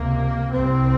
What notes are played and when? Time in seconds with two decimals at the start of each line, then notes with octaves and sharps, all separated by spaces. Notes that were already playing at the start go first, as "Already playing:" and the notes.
Already playing: C#2 C3 A#3
0.53 C2 C3 C4